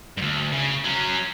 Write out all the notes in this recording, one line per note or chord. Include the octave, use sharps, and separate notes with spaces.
D2 G2
C#3
F#3 C#4